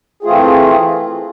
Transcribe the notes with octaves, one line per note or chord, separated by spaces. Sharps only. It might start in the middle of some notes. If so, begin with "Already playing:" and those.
E3 A3 C4 F4 G#4